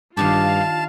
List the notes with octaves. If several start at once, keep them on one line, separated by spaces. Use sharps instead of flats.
G2 D#3 D4 F4 G4 F5 A5